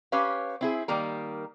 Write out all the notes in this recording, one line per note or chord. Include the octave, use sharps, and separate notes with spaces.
C#4 G4 B4 C#5 F5
C4 E4 G#4
D#3 G3 A#3 A#4